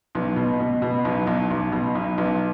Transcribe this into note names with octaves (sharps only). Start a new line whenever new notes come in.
B1
B2
B2
B2
B1
B1
B1
B2
B1
B1